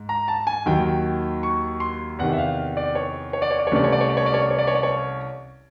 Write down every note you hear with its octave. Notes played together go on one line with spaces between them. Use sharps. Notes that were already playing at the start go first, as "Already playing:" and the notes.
Already playing: G#2
A#5
A5
G#5
D#2 D#3 F#3 G5
C#6
C6
E2 C3 D#3 F#5
E5
F5
D5
C#5
C#5
D5
C#5
D5
C#5
C2 C3 E3 A3 C#4 D5
C#5
D5
C#5
D5
C#5
D5
C#5
D5
C#5
D5
C#5
D5
C#5